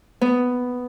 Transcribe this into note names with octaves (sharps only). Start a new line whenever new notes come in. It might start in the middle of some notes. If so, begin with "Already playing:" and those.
B3